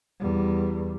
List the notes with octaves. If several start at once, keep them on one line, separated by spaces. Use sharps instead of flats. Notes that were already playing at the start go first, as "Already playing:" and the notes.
E2 G3